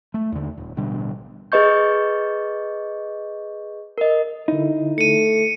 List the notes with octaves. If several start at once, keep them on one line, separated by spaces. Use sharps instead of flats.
A3
D#2 D3
D#1
A1 B2 D3 G3
G#4 B4 D#5 C#6 G6
A#4 D#5
D3 D#4 E4
A3 C#7 D#7